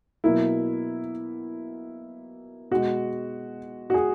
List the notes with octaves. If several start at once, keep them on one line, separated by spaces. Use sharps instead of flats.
B2 F#3 A#3 E4
B2 G#3 F#4
F#4
G#4